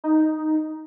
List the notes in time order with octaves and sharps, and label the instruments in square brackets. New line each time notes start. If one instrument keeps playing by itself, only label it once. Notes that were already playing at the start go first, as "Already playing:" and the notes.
[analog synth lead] D#4